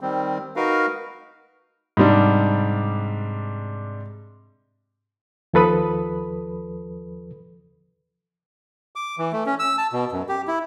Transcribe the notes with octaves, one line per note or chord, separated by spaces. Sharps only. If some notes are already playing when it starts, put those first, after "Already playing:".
D#3 G3 C4
D#4 F#4 A#4 B4 F5
G#2 C3 G3 D4
D#2 F3 A4 B4 B5 D#6
D6
E3
A3
C#4
E6
A5
B2
F#2
G4
E4